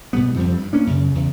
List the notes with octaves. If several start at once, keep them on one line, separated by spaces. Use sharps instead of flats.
G#2 B2 G3 B3
F2 F3 G3 C4
G2
A#3 C#4 D4
F#2 C#3
E2 C#3